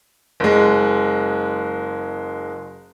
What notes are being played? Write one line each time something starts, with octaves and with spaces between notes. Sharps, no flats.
F#1 G#3